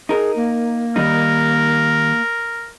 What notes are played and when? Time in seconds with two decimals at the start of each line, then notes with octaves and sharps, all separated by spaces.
0.09 D#4 G#4 A#4
0.36 A#3
0.96 D#3 G3 D#4 A#4